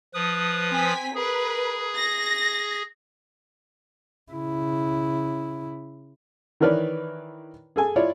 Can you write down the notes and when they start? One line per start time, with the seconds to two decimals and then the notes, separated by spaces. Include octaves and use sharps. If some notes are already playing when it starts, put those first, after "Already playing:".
0.14 F3 B4 D#6
0.72 C4 G#5 B6
1.15 G#4 A#4 B4
1.97 A#6
4.32 C#3 E4
6.60 D#3 E3 A#4 B4 C#5 D5
7.76 G#4 A4 G#5
7.96 E4 F4 C#5 D5